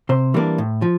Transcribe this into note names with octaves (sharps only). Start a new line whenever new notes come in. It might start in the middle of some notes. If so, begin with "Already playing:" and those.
C3 C5
E3 G3 A#3 D4
A2
F3